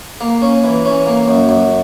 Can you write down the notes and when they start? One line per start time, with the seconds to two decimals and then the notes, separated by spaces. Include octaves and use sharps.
0.21 A#3
0.42 C#4
0.64 E3
0.85 C#4
1.06 A#3
1.27 F#2
1.49 F#2